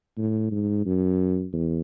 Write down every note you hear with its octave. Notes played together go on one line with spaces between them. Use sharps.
A2
G#2
F#2
E2